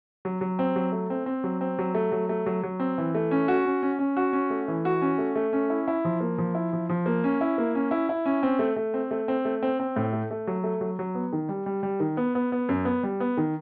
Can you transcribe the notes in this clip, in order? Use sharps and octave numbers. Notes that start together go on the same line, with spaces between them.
F#3
F#3
C4
F#3
A3
C4
C4
F#3
C4
F#3
A3
F#3
A3
F#3
F#3
C4
E3
A3
C#4
F#4
C#4
C#4
C#4
F#4
C#4
A3
E3
F#4
C#4
A3
A3
C#4
E4
E4
F3
A#3
F3
E4
F3
F3
A#3
C#4
E4
A#3
C#4
E4
E4
C#4
C4
A3
A3
C4
A3
C4
A3
C4
C4
A2
A3
A3
F#3
A3
F#3
F#3
B3
D#3
G3
G3
G3
D#3
B3
B3
B3
F#2
B3
G3
B3
D#3